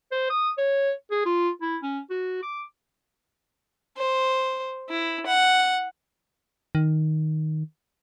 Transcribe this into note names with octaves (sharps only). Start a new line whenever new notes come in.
C5
D#6
C#5
G#4
F4
E4
C#4
F#4
D6
C5
E4
F#5
D#3